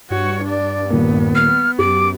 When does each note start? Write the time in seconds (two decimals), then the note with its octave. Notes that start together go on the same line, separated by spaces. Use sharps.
0.10 G2 F#4 C#5
0.44 D4 D5
0.90 D#1 A#3 B3
1.35 F6
1.79 F#2 G4 D6